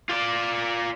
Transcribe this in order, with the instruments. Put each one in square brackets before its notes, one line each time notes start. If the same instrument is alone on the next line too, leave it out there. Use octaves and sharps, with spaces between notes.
[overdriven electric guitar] F4 D5